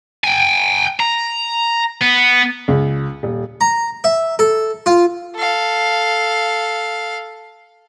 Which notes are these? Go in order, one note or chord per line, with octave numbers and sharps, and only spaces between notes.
G5 G#5
A#5
B3
C#2
D#1
A#5
E5
A4
F4
A4 F5